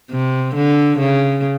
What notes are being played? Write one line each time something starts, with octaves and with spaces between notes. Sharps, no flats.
C3
D3
C#3